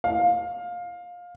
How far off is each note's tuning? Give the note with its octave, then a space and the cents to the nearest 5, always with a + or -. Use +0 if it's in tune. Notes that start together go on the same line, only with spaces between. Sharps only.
F5 +20